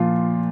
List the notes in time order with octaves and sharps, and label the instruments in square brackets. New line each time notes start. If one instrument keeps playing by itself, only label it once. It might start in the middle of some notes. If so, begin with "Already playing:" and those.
Already playing: [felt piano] A#2 F3 F4